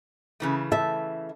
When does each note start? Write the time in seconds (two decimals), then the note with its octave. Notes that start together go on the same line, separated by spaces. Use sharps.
0.40 C#3 E3 A3
0.72 E5 A5